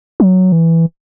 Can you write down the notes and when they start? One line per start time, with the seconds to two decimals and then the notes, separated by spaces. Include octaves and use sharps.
0.20 F#3
0.52 E3